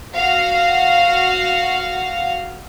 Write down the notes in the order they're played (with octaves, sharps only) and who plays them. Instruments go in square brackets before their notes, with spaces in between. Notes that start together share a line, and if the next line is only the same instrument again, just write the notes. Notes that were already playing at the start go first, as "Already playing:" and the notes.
[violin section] F#4 F5